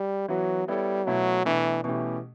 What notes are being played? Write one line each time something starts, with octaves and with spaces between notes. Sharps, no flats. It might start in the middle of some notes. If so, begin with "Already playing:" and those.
Already playing: G3
E3 F#3 B3 F#4
G3 B3 E4 A4 C#5
B2 F#3 A3 E4 B4
B2 E3 A3 D4 A4
B2 E3 A3 C#4 G4